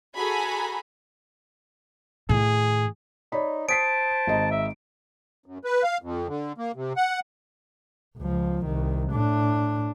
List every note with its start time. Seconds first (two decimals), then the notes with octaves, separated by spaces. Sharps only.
0.16 F#4 G#4 A4 G#5 A#5 B5
2.29 A2 D#3 G#4
3.32 D#4 C#5 D5 B5
3.69 C5 A5 D#6 B6 C7 D7
4.27 G#1 D#5 A#5
4.51 E5
5.46 F#2
5.64 B4
5.83 F5
6.02 F2
6.28 D3
6.58 A#3
6.76 C3
6.96 F#5
8.18 C#2 F3
8.65 C2 D#3
9.12 A2 D4